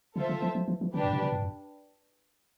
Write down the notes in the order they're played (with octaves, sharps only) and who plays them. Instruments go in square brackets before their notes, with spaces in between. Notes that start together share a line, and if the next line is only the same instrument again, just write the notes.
[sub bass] D3 [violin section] F4 A4 C5 E5
[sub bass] D3
E3
F3
E3
E3
[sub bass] D3 [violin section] D4 G4 B4
[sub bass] G2
B2
C3
G2
F2